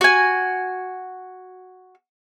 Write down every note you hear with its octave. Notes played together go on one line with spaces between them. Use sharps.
F#4 G#5